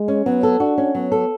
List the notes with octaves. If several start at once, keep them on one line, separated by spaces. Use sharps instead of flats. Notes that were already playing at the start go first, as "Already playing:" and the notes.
Already playing: G#3
C#4
F#3 B3
A4
D4 F#4
C#4
F#3 B3
A4